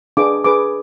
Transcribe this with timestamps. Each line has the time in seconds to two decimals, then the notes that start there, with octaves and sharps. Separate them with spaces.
0.17 D4 G#4 B4 D6
0.44 D4 G#4 B4 D6